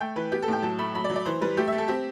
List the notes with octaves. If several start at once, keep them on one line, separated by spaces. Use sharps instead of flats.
A3 G5
E3 B4
B3 G4
A4
A2 G5
F#3 A5
A3 B5
F#3 B5
D5
F#3
D5
E3 C5
G3 B4
A3 G4
A3 E5
A4
C4 G4